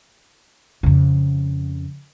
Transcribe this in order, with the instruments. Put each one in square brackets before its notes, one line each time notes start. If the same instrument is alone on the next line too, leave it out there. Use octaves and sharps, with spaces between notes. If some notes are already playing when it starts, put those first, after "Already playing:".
[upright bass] F2 C#3